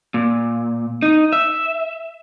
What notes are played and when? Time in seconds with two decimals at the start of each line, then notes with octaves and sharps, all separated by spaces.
0.14 A#2
1.02 D#4
1.33 E5